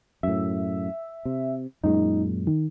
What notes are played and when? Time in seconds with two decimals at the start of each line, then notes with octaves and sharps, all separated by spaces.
0.23 F#2 A2 E5
1.25 C3
1.84 F#2 A#2 G#3 D#4
2.47 D#3